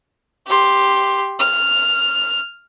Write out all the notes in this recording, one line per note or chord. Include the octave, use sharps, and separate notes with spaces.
G4 C6
F6